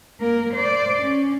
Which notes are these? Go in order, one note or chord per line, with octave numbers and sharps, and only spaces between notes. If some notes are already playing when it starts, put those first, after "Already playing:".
A#3 A#4
C5 D5
C#4